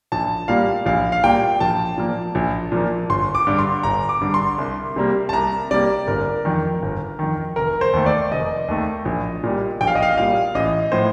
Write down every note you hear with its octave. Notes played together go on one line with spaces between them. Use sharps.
A#1 A5
A#2 G3 A#3 F5
A#1 F5
F5
A#2 G3 A#3 G5
A#1 A5
A#2 F3 A#3
A#1
A#2 F3 A#3
G1 C6
D6
G2 D3
C6
G1 A#5
D6
G2 D3
C6
C2
C3 G3 A#3
A5
C2 A#5
C3 G3 A#3 D5
G1 A#4
F2 D#3
G1
F2 D#3
F1 A#4
C5
D#2 D#3 A3
D5
F1 D#5
D#2 D#3 A3
A#1
A#2 G3
A#1 G5
F5
D#5
F5
A#2 G3 F5
A1 D#5
A2 F3 C5